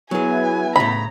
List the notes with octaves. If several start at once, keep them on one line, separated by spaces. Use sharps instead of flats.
F#3 B3 E4 G#4 B4 G#5
A2 C#3 A#5 B5